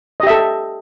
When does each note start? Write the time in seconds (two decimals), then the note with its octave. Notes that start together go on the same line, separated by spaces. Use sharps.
0.20 D#5
0.23 G4
0.27 E5
0.30 A4